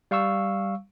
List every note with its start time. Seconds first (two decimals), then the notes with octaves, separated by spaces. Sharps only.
0.11 G3 F5 C#6 E6